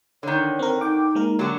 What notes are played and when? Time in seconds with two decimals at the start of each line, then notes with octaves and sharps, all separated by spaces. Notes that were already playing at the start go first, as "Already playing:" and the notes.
0.23 D3 D#3 C#5
0.59 C4 A#4
0.81 D#4 G5 D6
1.15 G#3 A#3 A#4
1.39 D3 F#3 G4